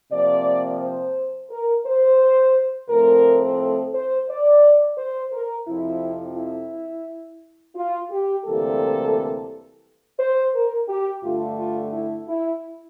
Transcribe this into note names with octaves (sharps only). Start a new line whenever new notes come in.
C3 F3 A#3 D5
C5
A#4
C5
A2 F3 A3 C4 A#4
A4
C5
D5
C5
A#4
F2 C3 F3 E4
E4
F4
G4
D2 C3 E3 G3 A#3 A4
C5
A#4
G4
G2 D3 A3 F4
F4
E4
E4